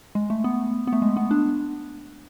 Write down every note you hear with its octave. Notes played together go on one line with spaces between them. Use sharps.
G#3
A3
B3
B3
A3
G#3
B3
D4